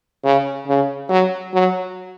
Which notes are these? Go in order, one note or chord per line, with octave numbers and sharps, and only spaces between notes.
C#3
C#3
F#3
F#3